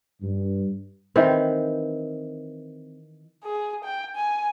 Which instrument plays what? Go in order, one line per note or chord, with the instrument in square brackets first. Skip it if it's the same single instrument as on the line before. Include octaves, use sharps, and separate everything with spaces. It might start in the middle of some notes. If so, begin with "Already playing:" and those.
[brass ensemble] G2
[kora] D#3 E3 C4
[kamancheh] G#4
G5
G#5